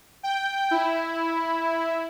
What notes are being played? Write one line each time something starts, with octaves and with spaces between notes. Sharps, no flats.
G5
E4